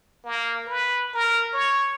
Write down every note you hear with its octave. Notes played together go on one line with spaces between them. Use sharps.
A#3
B4
A#4
C#5